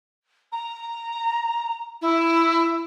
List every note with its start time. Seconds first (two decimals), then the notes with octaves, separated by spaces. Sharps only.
0.52 A#5
2.01 E4